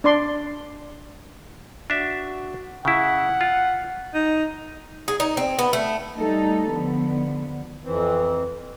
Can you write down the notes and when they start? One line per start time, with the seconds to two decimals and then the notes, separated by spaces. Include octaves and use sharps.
0.04 D4 D5 C6
1.90 D4 F#4 E5
2.85 C#3 E4 F#5
3.41 F4
4.14 D#4
5.08 G#4
5.20 D#4
5.37 C4
5.59 B3
5.73 A3
6.16 G3 A3 D#4 A4
6.71 D3 F3 B3
7.84 F2 E3 C4